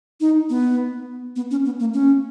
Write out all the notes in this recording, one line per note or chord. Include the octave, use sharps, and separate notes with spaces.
D#4
B3
B3
C#4
B3
A#3
C#4